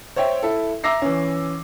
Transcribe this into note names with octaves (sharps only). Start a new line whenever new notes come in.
C5 C#5 E5 G5
E4 A4
E5 A#5 D6 E6 A#6 C7
E3 C#4